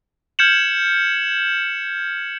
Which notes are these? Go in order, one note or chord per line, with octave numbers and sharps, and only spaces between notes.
F6 G6 G#6 C#7 E7 F#7